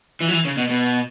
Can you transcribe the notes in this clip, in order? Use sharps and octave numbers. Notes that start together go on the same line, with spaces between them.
E3
F#3
E3
C#3
B2
B2